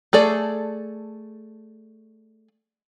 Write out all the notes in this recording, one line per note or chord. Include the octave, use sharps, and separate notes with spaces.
A3 G#4 A4 D5